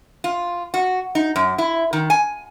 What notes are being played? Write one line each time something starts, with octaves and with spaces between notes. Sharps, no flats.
F4
F#4
D#4
F#2
E4
D#3
G#5